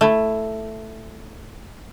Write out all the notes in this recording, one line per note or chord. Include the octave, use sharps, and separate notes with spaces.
A3 E4